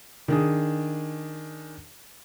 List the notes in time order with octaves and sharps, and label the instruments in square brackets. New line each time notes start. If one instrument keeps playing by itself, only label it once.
[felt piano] D#3 D4 G#4